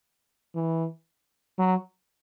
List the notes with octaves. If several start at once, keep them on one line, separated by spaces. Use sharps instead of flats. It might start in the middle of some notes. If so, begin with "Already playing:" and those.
E3
F#3